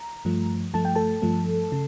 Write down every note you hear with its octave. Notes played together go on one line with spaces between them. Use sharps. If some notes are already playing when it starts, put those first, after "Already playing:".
Already playing: A#5
G2 F3 A3
G2 F3 A3 A5
G5
A4 A5
G2 F3 A3
C#3